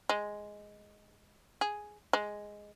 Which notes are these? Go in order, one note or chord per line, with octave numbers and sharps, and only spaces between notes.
G#3
G#4
G#3